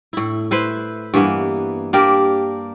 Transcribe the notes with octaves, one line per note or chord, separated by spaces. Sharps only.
A2 E4
E4 B4 C5
G2 E3 A#3 B3
A#3 D4 G4 A#4